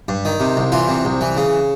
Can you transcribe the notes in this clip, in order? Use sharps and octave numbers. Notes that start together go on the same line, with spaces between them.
G2
D#3
C3
C2
E3 F4
C3
C2
E3
C#3